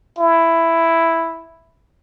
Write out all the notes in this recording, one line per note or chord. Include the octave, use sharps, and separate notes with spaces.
E4